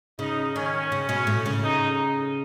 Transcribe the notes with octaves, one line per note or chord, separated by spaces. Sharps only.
C#3 D#4
D#3 C#4
C#3
B2
A2
C#3
D#4